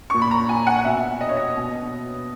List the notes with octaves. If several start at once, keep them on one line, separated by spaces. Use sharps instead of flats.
A#2 C#6
B5
A#5
G#5
F#5
B2 E5
D#5
C#5
D#5
B2